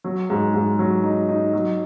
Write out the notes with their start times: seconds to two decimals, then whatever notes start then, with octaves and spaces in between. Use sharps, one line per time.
0.04 F#3
0.30 G#2
0.54 G#2
0.79 F#3
1.04 D#4
1.29 D#4
1.53 F#3